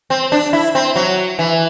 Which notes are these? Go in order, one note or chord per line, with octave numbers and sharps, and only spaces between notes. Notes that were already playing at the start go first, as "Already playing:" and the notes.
C4
D4
E4
C4
F#3
E3